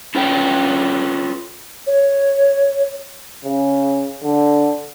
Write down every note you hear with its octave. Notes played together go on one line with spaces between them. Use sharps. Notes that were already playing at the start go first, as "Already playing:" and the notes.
C#4 F4 A4 B4 C#5 G5
C#5
C#3
D3